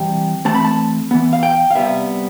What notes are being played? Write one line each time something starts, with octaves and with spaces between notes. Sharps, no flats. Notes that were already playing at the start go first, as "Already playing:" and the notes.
Already playing: C3 E3 G3 G5
E3 A3 C4 A5
B5
A5
E3 B3
F5
G5
F5
C3 G3 B3 E5